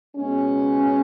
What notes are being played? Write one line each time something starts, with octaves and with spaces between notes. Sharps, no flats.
B2 G#3 B3 C#4